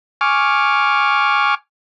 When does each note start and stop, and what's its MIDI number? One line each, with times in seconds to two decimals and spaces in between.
0.21 1.55 80
0.21 1.55 85
0.21 1.55 86
0.21 1.55 89